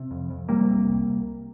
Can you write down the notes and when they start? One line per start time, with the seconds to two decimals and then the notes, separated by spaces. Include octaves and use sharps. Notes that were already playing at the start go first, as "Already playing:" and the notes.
Already playing: C3
0.11 F2
0.30 F2
0.49 C3 G3 A#3
0.68 C3
0.87 C2